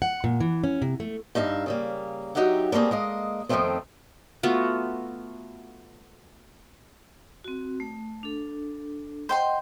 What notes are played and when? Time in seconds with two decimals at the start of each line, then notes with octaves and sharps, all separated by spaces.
0.02 F#5
0.24 A#2
0.40 E3
0.64 C#4
0.82 C3
1.00 A3
1.35 G2 D#4 E5 F5
1.66 C#3 G3 A#3
2.35 F#3 D#4 G4 E5 F#5
2.72 G3 A3 A#3 C4 G#4
2.91 G#3 A#3 D#5
3.49 F2 D#3 F3 F#3 A3 C4
4.43 A3 B3 F4 F#4
7.44 C4 F#4
7.80 A3
8.23 D4 A4
9.29 C5 D#5 F#5 G5 C6